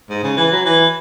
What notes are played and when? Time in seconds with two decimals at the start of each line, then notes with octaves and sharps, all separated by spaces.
0.10 G#2
0.23 C#3
0.37 E3
0.51 F#3
0.65 E3